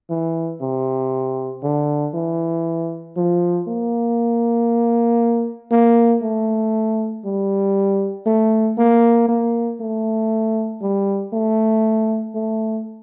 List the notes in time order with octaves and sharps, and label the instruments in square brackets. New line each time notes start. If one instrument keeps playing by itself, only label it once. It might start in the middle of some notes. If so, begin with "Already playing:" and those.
[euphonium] E3
C3
D3
E3
F3
A#3
A#3
A3
G3
A3
A#3
A#3
A3
G3
A3
A3